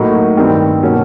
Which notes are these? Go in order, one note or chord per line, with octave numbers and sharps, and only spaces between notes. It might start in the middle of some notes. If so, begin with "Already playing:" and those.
Already playing: A2 F#3 A#3 D#4
G2 D#3 G3 C4
B2 F#3 A#3 C#4